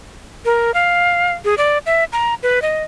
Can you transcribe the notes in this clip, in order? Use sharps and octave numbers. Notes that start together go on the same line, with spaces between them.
A#4
F5
G#4
D5
E5
A#5
B4
D#5